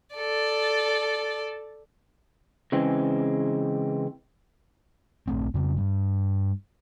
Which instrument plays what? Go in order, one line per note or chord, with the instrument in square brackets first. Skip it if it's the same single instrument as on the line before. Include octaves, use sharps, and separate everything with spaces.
[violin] A4 D5
[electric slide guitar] C#3 E3 G#3 C4
[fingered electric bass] A#1 A3 C4
F2 C#3 C4
G2